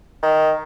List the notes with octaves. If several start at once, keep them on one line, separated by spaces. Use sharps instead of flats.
D#3